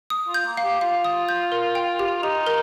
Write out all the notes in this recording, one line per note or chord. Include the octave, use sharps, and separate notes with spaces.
D#6
F4
G6
A#3
F5
G4
F4 F5
D#6
G6
A#4
G5
G4
D#4 G4
A#4